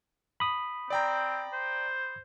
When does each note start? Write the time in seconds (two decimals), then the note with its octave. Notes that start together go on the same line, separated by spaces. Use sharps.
0.40 B5 D#6
0.90 C4 D5 G5 A#5
1.53 C5